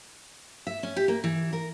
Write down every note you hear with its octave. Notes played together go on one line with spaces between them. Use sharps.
E5
C#4
G4
A#3
E3
A#4